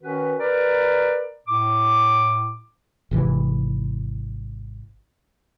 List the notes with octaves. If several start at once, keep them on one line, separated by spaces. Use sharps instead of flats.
D#3 C#4 F#4 B4
A#4 B4 D5
A2 D6
G#1 C3 E3